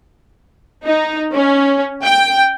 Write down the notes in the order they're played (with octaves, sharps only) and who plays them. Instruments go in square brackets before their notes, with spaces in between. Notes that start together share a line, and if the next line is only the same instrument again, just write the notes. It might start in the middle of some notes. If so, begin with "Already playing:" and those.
[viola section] D#4
C#4
G5